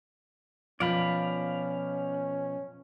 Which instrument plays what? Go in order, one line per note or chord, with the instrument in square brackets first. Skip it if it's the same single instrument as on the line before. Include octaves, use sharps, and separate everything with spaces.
[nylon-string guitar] B2 F3 [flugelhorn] C#4 [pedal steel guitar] D5 F5 B5